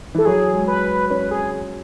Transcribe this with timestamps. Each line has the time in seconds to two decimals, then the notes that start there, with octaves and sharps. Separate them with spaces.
0.15 E3 A4
0.25 F#3 G#4
0.54 G#3
0.68 B4
1.10 C#4 B4
1.31 G#4